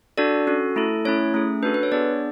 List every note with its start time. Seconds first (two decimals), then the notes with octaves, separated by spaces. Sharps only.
0.18 D4 F#4 A4 D5
0.47 C#4 F#4 A4
0.76 A3 E4 A4
1.05 A3 C#4 E4 C#5
1.34 A3 C#4 G#4
1.63 D4 F#4 A4 B4
1.74 B4
1.83 C#5
1.92 B3 D4 G#4 D5